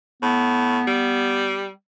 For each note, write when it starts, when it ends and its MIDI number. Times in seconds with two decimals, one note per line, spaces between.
0.23 0.82 45
0.23 1.68 59
0.87 1.70 55